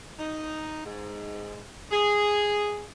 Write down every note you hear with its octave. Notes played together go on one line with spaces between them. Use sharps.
D#4
G#2
G#4